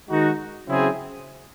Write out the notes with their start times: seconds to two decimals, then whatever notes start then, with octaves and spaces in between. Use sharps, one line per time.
0.09 D#3 G#3 D#4 F#4
0.67 C#3 F#3 C4 E4 G#4